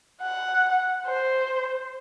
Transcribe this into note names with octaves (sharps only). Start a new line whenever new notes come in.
F#5
C5